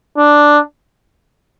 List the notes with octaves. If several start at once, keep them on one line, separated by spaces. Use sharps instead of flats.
D4